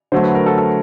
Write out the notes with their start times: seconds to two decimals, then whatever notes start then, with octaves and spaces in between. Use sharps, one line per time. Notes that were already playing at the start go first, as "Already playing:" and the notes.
0.12 D3 F#3 A3 C5
0.24 B4
0.35 A#4
0.46 A4
0.58 A4